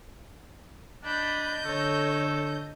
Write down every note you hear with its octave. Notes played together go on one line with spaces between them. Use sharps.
D4 D#5 B5 G6
D3 A4 C#5